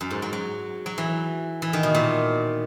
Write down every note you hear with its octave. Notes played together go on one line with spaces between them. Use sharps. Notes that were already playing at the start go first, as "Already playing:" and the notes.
F#2
G#2
F#3
F#3
F#3
E3
E3
D#3
B2
A#2